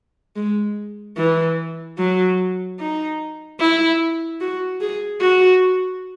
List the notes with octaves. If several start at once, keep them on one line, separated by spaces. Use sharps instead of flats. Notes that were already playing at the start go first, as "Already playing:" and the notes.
G#3
E3
F#3
D#4
E4
F#4
G#4
F#4